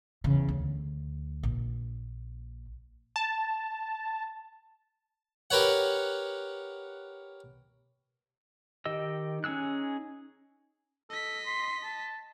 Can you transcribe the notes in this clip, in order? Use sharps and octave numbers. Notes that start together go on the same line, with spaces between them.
E2 C#3
D2
A#1
A5
G4 A#4 B4 C#5 F#5
D#3 G4 D#5 E6
C#4 D#4 G#4 E6 F#6
A4 D#5 B6
C6
A5